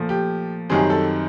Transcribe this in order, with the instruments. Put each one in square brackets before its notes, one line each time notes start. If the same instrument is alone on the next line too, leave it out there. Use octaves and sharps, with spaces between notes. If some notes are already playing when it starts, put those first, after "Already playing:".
Already playing: [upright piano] A#2 F3 A3
G4
F#2 D#3 G3 C4 G#4
A4